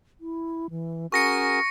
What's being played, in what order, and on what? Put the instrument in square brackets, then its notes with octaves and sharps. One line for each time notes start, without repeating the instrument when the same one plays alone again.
[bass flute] E4
E3
[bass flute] C#4 [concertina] F#4 G#4 A#4 [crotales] C#6 A#6 C#7